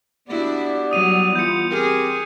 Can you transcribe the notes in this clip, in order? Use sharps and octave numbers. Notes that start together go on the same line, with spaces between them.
B3 D4 E4 F#4 G4 D5
F#3 G3 D#6 D#7 F7
E3 B3 F4 G6 C#7
C4 G4 G#4 A#4